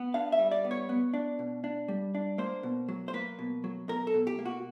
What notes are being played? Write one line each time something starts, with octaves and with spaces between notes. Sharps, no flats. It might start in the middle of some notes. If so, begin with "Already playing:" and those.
Already playing: B3
D4 F5
E5
G3
D5
B3
C#5
B3
D4
B2
D4
G3
D4
A#3 C5
B2
F#3
C5
A#3 B4
B2
F#3
B2 A#4
A4
B2
G4
A#3
F#4